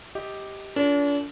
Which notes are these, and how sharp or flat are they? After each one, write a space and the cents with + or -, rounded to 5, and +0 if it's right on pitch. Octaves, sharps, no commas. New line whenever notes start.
G4 +0 D#5 +15
D4 -40 F4 +0 A4 +40